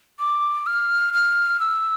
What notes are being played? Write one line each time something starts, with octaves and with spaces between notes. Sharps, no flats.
D6
F6
F6
E6